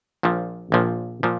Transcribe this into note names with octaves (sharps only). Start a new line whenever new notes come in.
A#1 A#2 F3
A#1 A#2 F3
A#2 F3